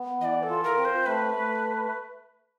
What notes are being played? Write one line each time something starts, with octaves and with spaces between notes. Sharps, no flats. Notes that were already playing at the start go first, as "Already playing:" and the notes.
Already playing: B3
E3 D5 D#5
A4
F4
A#4
C4
C5
A3 B4
A3